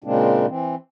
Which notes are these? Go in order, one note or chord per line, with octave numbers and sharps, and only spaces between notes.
A#2 C#3 G#3 A#3 C4 D4
E3 C4